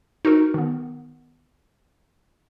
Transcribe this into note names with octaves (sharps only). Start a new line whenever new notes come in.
D#4 F#4 A4 A#4
D#3 B3